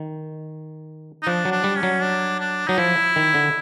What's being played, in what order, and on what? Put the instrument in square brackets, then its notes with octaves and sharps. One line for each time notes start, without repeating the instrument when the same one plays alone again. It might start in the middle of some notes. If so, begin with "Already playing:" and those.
Already playing: [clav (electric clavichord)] D#3
[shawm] D#4
[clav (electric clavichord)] F3 [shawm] D4
[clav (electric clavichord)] F#3
[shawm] D4
[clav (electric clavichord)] G3
[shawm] C#4
[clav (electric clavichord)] F#3
[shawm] D4
D4
[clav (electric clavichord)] F#3 [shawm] D#4
[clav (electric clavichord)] F3 [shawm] E4
[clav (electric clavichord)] D#3
D3